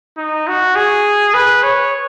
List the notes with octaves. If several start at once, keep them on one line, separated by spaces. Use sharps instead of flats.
D#4
F#4
G#4
B4
C#5